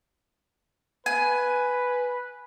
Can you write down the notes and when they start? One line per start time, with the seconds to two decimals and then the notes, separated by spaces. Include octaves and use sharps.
1.06 B4 G#5